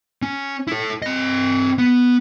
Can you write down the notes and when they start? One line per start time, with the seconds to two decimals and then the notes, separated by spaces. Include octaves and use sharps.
0.22 C#4
0.68 E4 A4
1.02 C4 D#5
1.78 B3